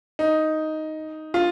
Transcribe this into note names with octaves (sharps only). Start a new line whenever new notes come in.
D#4
F4